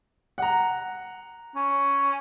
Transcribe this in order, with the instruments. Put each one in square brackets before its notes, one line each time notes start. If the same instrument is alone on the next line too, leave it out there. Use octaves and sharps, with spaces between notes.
[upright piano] F#5 A#5
[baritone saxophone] C#4